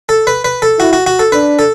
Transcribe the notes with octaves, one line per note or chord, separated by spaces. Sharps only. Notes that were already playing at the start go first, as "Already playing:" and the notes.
A4
B4
B4
A4
E4 F#4
F#4
F#4
A4
D4 B4
A4